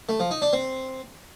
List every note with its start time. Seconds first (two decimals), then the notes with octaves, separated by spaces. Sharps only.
0.09 A3
0.20 F3
0.31 D#4
0.42 D4
0.53 C4